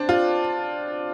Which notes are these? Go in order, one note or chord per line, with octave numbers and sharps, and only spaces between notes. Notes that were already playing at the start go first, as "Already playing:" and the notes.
Already playing: C4 D4
F4